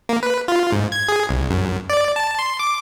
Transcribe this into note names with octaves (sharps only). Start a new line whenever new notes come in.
A#3
B4
F4
G#2
G#6
G#4
C2
F#2
D5
A5
C6
D6